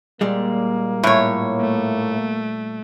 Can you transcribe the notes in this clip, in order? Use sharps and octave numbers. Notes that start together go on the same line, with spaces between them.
A#2 G3 G#3 A#3
A2 C#5
A3